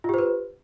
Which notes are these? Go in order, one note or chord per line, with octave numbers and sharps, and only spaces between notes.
F4 G4 B4 C5